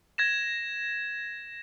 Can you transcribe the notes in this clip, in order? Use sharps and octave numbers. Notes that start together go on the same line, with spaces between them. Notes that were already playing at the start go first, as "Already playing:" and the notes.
G#6 A#6 E7